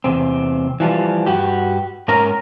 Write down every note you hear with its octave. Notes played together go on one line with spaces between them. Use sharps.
E2 C3 C4
E3 F3 G3
G2 F#4 G4
G#2 C#4 A#4 A#5